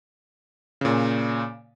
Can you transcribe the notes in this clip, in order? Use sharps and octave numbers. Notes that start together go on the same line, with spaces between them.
A#2 C#3